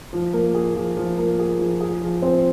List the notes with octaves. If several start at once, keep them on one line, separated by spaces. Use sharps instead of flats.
F3
A#3
G#4
F3
F3
A#3
G#4
F3
G#4
F3
C4